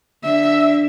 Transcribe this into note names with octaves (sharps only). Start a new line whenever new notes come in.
D3 E5